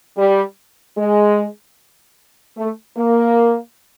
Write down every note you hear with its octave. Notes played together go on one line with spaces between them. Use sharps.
G3
G#3
A3
A#3